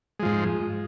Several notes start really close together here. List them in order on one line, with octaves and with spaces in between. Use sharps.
G#3 F3 G#2